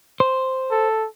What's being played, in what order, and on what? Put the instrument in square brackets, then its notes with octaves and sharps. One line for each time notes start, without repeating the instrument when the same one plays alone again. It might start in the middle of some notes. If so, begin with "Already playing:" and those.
[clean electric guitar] C5
[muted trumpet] A4